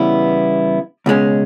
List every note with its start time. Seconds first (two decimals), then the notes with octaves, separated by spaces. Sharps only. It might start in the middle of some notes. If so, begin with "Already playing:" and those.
Already playing: C#3 E3 G3 B3 E4
1.06 C#2 B2 G#3 C#4